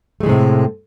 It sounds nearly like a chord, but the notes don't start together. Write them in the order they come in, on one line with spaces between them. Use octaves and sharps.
A3 G#3 E3 C3 A2